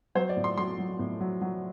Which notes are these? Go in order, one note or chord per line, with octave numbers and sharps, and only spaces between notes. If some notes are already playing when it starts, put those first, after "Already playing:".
F#3 C5
D5
A2
C6
F#3 C6
F#3
A2
F#3
F#3